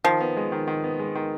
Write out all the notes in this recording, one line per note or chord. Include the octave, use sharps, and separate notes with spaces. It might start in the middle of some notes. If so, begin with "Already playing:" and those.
D#3 F3
B3
G#3
D#3
D#3
B3
G#3
D#3